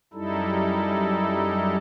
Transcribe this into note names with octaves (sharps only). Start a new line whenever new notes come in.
F#2 G3 D#4 E4 A4